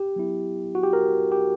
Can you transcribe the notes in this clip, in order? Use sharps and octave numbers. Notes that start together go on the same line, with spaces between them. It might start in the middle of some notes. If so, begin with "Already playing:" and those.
Already playing: G4
F#3 B3 E4
F#4
G4
A#4
G4